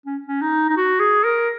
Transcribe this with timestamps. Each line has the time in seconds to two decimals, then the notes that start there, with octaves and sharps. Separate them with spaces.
0.06 C#4
0.27 C#4
0.42 D#4
0.70 D#4
0.77 F#4
1.00 G#4
1.24 A#4